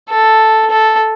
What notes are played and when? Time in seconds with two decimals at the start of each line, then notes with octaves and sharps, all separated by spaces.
0.10 A4
0.71 A4